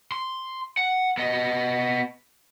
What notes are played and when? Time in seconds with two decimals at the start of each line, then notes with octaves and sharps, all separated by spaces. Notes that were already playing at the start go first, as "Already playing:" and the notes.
0.12 C6
0.77 F#5
1.17 B3 D#5